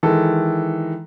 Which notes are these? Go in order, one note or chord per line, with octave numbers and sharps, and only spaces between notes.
D#3 E3 G#3 A4